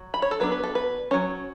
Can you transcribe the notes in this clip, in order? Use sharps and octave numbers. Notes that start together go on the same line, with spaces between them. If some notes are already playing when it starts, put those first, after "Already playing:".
Already playing: F#3
B5
C#5
A4
F#3 B3 D4 B4
B4
A4
B4
F#3 A3 C#4 C#5